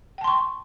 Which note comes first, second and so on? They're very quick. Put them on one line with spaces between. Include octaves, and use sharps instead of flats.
G5 A5 C6 C#6